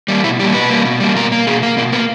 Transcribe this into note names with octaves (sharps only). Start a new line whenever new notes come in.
G3 A#3
B2 E4
G3 A#3 G4
B2 B4
G3 A#3
B2
G3 A#3
B2 A#4
A#3
B2 G#4
A#3
B2 A#3
A#3 B3